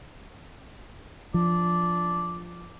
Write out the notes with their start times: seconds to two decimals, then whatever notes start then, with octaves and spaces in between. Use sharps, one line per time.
1.34 F3 D4